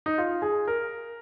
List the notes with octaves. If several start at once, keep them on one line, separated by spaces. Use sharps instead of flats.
D#4
F4
G#4
A#4